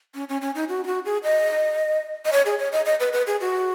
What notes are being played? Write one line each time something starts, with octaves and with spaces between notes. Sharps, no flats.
C#4
C#4
C#4
D#4
F#4
D#4
F#4
G#4
D#5
D#5
C#5
G#4
C#5
D#5
D#5
B4
B4
G#4
F#4